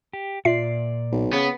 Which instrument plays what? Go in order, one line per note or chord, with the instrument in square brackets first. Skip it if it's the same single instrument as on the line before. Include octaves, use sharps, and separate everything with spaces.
[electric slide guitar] G4
[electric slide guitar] A#2 D5 [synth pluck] F4 E5 C7
[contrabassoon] B1
[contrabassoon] C#3 [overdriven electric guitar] B3